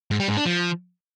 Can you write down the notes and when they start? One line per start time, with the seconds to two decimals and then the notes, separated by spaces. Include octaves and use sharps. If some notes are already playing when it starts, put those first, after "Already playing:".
0.11 G#2
0.20 G3
0.28 G#2
0.37 D4
0.46 F3